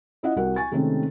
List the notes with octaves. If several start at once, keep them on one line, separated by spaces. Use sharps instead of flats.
C#4 E4 F4 D#5 F#5
C2 F#4 A#4 F#5
G#5 C#6 A6
C3 D#3 G#3 A3 C4 C#4